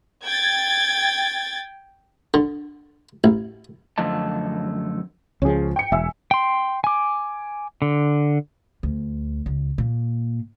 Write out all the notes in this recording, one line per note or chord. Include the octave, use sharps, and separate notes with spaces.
G5 G#6 A6
D3
A1
F#2 D3 F3 A3 D#5 A5
C#2 F3 C#4 G#4
G5 C#7
E1 E5 G#5 E6
G5 C6
G#5 D6
D3
D2
C#2
A#2